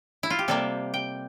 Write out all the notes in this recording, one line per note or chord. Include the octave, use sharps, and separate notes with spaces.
E4
F4
G4
C3 G3 A#3 A4
G5